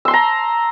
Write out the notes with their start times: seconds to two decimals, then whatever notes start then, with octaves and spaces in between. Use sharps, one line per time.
0.05 E6
0.08 C6
0.11 A5
0.13 A#5